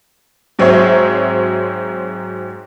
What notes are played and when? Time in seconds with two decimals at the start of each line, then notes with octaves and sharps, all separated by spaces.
0.59 G#2 F#3 C4 C5 C#5 E5